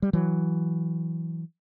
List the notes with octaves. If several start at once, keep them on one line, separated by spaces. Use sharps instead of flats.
G3
E3 F#3